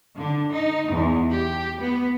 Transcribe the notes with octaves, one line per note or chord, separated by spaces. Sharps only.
D3
D#4
E2
G4
B3